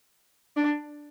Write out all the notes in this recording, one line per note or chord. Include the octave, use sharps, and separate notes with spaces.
D4